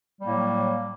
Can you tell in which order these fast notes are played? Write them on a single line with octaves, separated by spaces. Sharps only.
G3 A#3 A2 F#3